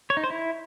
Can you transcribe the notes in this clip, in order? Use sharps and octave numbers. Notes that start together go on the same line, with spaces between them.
C#5
D#4
C5
E4